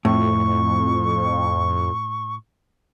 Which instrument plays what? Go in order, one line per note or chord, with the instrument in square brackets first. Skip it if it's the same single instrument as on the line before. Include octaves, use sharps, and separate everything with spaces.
[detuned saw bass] F2 [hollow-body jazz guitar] A2 [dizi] C#6